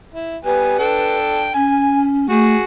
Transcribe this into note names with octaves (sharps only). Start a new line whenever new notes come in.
E4
G3 B3 B4 G#5
D4 A4 G5
C#4 G#5
A3 F#4 G#4